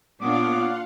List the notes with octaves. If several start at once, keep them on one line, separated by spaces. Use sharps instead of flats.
A#2 B3 D4 F4 C#5 F5 F#5 D6